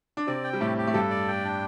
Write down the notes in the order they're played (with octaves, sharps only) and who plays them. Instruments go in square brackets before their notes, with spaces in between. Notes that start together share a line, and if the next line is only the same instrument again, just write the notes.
[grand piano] D4
[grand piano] C3 C4 [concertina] D5
[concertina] G5
[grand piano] G3
[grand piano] A2 A3 [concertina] G4
[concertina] G4
[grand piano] A3
[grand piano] G2 G3 [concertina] A4
[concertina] D5
G5
D4